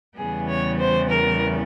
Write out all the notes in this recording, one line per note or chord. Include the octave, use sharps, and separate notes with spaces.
E2 C#3 E3 G3 B3 G#4
C#5
C5
A#4